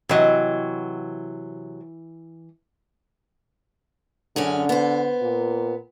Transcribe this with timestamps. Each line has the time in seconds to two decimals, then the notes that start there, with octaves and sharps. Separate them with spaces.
0.09 C3 E3 F#3 D#5 F#5
4.36 F#2 D3 C#4 G#4
4.69 B3 C5
5.21 A#2